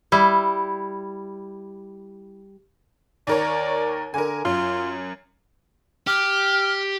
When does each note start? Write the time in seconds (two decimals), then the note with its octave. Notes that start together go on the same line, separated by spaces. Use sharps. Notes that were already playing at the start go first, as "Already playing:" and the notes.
0.12 G3 E4
3.27 D#2 A#4 C#5 D5
4.14 D3 A#4 G#5
4.45 F#2 F4
6.07 G4 F6